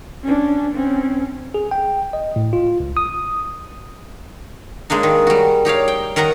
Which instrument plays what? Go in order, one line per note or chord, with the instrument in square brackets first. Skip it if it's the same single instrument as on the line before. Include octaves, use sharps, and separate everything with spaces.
[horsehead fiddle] C#4 D4
C4 C#4
[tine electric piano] G#4
G5
D#5
A2
F4
C#2
D#6
[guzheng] G#3 A#3 D4 D#4
D#3
G3 F#4
D#4 G4 C#5 F5
G5
D#3 A#4 D#5 F#5 A#5